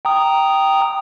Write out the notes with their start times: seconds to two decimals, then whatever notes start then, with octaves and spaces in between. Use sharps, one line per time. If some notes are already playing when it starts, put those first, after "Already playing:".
0.05 G5 A#5 D#6